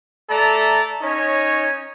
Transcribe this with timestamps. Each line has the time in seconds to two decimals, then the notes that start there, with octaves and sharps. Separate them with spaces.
0.29 A3 A4 D5 A#5
1.02 C#4 D#4 C#5